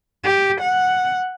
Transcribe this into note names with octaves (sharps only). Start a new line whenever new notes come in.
G4
F#5